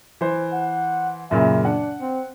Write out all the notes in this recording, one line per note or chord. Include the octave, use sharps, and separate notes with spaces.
E3 C5
F#5
F#2 A#2 C#3 E5
D4 F#5
C4